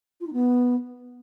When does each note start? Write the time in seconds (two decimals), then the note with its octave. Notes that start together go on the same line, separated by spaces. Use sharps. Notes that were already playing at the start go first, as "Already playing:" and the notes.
0.20 F4
0.27 D#4
0.33 B3